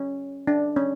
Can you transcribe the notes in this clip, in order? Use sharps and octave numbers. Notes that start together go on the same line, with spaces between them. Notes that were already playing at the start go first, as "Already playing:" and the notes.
Already playing: C#4
D4
C#4